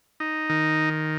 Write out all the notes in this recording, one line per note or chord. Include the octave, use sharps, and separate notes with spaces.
D#4
D#3